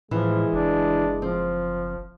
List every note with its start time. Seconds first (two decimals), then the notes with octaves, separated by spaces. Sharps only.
0.11 A2 E3 F3 G#3
0.53 F#1 D4
1.22 F3 C4